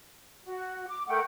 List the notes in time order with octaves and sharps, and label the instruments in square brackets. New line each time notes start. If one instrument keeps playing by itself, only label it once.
[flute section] F#4
D6
[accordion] A3 [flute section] A#4 F#5 G5